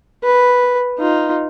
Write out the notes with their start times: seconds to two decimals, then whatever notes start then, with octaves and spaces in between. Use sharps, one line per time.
0.23 B4
0.99 D#4 F4